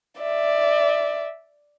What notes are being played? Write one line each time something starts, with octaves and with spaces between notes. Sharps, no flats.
D5 E5